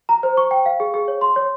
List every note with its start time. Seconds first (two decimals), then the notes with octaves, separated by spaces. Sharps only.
0.09 A#5
0.23 C5
0.37 C#6
0.51 G5
0.66 F5
0.80 G#4
0.94 G#4
1.08 C#5
1.21 C6
1.36 C#5